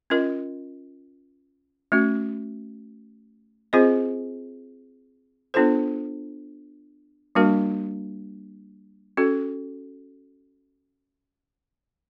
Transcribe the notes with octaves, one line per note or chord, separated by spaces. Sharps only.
C#4 F4 A#4 D#5
A3 C#4 F#4
C4 F4 G#4 C5 D#5
B3 D4 F4 A4 C5
G3 A#3 D4 F#4 A#4
C#4 F#4 A4